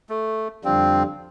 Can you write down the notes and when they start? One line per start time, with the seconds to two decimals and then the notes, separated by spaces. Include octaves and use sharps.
0.09 A3
0.64 F2 D3 G3 C4 D4 F4